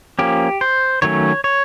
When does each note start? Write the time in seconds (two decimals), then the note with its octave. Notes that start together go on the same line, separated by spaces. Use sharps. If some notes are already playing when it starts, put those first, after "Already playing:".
0.19 F3 A#3 C#4 G4
0.61 C5
1.02 D#3 F#3 A3 C#4 C#5
1.44 C#5